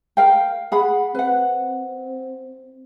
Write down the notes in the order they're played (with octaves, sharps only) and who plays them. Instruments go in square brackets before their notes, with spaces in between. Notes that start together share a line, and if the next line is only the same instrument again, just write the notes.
[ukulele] A#4 F5 G5
G#4 F#5 B5
[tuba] C4 [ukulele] B4 F#5